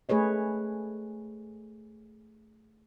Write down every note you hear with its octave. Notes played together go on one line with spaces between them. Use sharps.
A3 G#4 B4 C#5 D#5